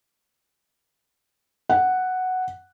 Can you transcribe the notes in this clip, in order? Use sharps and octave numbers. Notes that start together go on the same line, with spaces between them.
F#5